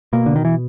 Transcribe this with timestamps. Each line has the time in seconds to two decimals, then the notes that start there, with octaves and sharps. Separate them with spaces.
0.13 B2 A#3
0.26 D3
0.36 D#3
0.45 E3